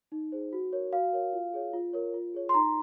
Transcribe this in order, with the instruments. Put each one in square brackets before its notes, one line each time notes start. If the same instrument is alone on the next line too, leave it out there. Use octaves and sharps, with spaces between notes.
[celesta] D#4
G#4 C5
F#4
A#4 C#5
F#4 F5
A#4 C#5
F4
G#4 C#5
F4
A#4 C#5
F4
G#4 C#5
C6
D#4 A#5